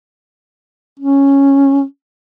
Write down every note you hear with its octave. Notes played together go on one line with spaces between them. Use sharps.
C#4